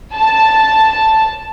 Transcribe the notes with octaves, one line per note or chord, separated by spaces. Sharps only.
A5